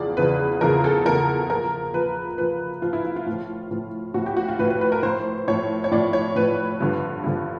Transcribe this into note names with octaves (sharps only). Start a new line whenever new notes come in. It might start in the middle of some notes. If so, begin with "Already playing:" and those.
Already playing: E2 C#3 F3 D5
E2 C#3 F3 B4
E2 C#3 F3 A#4
A4
E2 C#3 F3 A#4
A#2 F3 A#4
A#2 F3 B4
A#2 F3 B4
A#2 F3 F4
E4
F4
F4
A2
F3
A2 F3
A2 F3 F#4
G4
F#4
F4
A2 F3 B4
B4
B4
A#4
A2 F3 C5
A2 F3 C#5
C#5
A2 F3 D5
C#5
A2 F3 B4
G2 D3 F3
G2 D3 F3